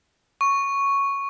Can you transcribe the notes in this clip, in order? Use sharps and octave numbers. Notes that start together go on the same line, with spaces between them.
C#6